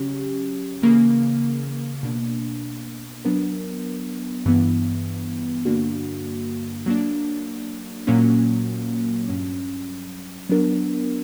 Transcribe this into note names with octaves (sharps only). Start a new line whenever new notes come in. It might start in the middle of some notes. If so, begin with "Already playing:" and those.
Already playing: C#3 F#3 C#4 G4
C#3 E3 A#3
B2 A#3 D4
F#3 B3 D4 A#4
G2 E3 B3
G2 D3 A#3 D4 F#4
F#3 A#3 D4
A#2 F#3 A#3 C#4
G2 F#3 C#4
F#3 B3 D4 A#4